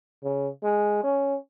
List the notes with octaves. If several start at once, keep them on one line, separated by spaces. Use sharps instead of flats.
C#3
G#3
C#4